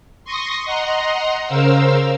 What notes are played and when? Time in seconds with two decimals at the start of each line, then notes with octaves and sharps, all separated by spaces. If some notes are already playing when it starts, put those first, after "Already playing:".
0.25 C6 C#6 D#6 A#6
0.65 D#5 F#5 A#5 C6
1.47 C#3 A#4 C5 F5 E6